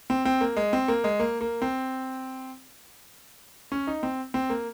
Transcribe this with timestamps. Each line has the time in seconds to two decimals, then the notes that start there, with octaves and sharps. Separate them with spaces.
0.10 C4
0.25 C4
0.41 A#3
0.57 G#3
0.73 C4
0.88 A#3
1.04 G#3
1.19 A#3
1.41 A#3
1.62 C4
3.72 C#4
3.87 D#4
4.03 C4
4.34 C4
4.50 A#3